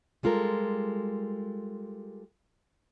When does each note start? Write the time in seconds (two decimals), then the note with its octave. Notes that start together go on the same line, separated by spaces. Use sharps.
0.23 G3 G#3 F4 A4 A#4